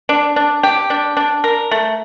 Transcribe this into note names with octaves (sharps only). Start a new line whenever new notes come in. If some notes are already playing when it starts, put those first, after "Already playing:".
D4
D4
G4
D4
D4
A#4
A3